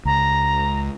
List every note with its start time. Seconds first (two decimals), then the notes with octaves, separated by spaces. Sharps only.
0.05 C#2 A#5